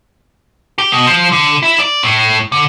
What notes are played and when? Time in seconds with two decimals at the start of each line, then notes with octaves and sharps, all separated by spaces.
0.78 G4
0.92 B2
1.07 F3
1.32 D3
1.63 E4
1.79 D5
2.03 A2
2.52 D3